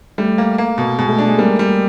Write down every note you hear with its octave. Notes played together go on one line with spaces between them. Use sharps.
G3 A3
A#3
A#3
B2
B2 G#3
A3
D4
G#3
G3 A#3
G3